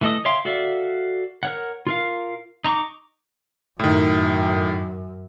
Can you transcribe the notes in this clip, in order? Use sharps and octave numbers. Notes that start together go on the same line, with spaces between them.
E3 A3 A4 D#5 D#6
C#5 E5 F5 G5 C6
F#4 A4 D5 E5 F5
A#4 C#5 F#5
F4 A#4 F5
D#4 A#5 C#6 D6
F#2 A2 D#3